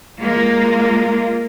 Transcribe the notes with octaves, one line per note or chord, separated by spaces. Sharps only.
G#3 A#3 F4